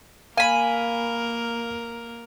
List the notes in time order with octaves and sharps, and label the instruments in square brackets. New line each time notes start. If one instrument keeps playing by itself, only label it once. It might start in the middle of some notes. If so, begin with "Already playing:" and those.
[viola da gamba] A#3 A#4 [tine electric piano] F5 [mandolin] G#5 B5